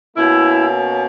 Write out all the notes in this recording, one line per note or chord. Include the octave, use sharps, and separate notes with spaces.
B2 A#3 C#4 E4